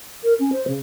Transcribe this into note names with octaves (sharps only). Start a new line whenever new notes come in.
A#4
C#4
C5
C#3